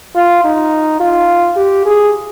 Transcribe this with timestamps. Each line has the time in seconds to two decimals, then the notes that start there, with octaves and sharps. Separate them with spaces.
0.16 F4
0.44 D#4
1.00 F4
1.56 G4
1.85 G#4